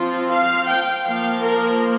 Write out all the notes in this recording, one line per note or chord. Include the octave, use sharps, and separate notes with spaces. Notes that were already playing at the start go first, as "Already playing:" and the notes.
Already playing: F3 C4 F4
F5
G5
F3 A#3 F5
A#4